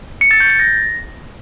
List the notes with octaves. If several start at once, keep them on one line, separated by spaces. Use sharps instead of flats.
C#7
A6
G6
A6
A#6